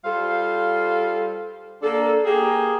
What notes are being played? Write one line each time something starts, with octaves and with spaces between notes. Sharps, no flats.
G3 F4 A4 C5 F5
A#3 D4 A4
A#3 G4 G#4